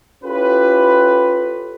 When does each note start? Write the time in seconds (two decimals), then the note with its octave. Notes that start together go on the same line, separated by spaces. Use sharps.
0.24 C#4 E4 F4 G4 A4 B4